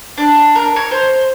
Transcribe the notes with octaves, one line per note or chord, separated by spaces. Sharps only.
D4
A#4
C#5
C5